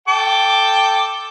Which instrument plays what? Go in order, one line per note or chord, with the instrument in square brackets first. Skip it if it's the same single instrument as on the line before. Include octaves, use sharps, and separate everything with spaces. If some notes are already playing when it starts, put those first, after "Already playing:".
[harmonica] A4 G5 D6